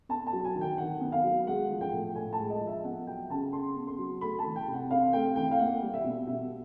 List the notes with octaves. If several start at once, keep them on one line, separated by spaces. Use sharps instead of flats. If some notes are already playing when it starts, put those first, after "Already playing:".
B3 A5
A5
F#3
G#5
D#3
G5
D#3 F#5
B3
F5
F#3
G#3 F#5
F3
G5
A2
A2 G#5
A5
G#3
D#5
F3
E5
B3 F#5
F#3 G5
C#3 A5
C#3 C6
B3
C6
F#3
A3 B5
A5
E3
G5
C3
F#5
C4 F5
A3 G5
E3 G5
F5
A#3 F#5
G3
E5
B2
B2 E5